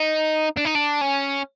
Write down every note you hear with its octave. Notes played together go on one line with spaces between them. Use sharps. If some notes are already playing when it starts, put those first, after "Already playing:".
Already playing: D#4
D4
D#4
D4
C#4